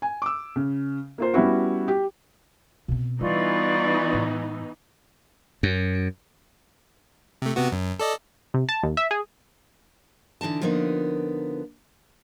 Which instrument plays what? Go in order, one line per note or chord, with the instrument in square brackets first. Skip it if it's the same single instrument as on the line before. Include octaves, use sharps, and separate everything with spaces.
[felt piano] G#5
D6 E6
C#3
A#3 F4 C5
G3 B3 C#4 E4 F#4
G4
[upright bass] B2 C4
[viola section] E3 B3 D#4 [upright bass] G3 [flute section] F4 D5 C#6
[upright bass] A2 G#3
[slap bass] F#2
[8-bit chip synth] C3 A3
C3 B3 F#4
F#2
A4 D5 D#5
[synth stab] C3
A5
D#2
E5
G#4
[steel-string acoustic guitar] D3 E3 D#4 A5
D3 F3 A#3 B3 D#4